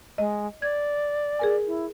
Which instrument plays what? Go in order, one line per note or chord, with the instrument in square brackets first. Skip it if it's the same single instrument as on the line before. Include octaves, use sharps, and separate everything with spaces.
[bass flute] G#3 [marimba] D#5
[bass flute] D5 [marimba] G#6
[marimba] G#4 A#4 G#5
[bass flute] E4